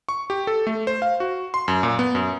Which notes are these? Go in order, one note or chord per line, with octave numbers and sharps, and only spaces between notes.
C#6
G4
A4
A3
C5
F5
F#4
C6
F#2
A#2
B3
F#2